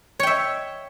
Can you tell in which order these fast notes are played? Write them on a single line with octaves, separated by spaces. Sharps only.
C#5 G5 E5